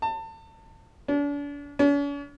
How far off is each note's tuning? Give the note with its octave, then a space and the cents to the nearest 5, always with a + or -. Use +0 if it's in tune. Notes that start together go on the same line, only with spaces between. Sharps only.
A5 +30
D4 -40
C#4 +45